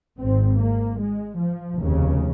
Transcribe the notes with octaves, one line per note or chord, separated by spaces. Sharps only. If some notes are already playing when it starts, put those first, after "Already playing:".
G#1 G#2 C4
A#3
G#3
F3
F1 D#2 C#3